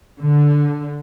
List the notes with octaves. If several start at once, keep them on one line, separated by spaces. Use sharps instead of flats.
D3